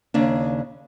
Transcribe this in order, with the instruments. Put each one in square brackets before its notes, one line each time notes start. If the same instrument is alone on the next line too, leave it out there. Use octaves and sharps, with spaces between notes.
[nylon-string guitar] D#2 C#3 D4